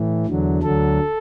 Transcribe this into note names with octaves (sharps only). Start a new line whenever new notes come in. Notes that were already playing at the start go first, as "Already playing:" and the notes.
Already playing: A2 E3
E2 D3 F#3
D2 D3 F#3 A4